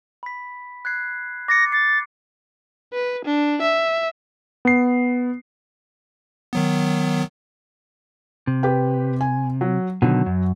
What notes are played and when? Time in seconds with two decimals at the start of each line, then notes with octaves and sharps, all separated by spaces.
0.23 B5 B6
0.85 F#6 G#6 C7
1.48 D6 A6 A#6 C#7
1.72 A6 C7
2.93 B4
3.25 D4
3.62 E5
4.65 B3 C7
6.53 D#3 F#3 B3
8.47 C3
8.63 G4 B4 G5
9.21 G#5
9.61 F#3
10.02 B2 D3 D#3 F#3
10.26 F#2